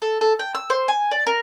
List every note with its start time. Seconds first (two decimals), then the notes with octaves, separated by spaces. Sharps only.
0.02 A4
0.21 A4
0.39 G5
0.55 E6
0.70 C5
0.88 G#5
1.11 D5
1.27 A#4